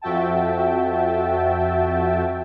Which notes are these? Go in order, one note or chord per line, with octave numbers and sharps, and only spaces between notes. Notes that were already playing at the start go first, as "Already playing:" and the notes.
F2 F#4 E5 G5 A5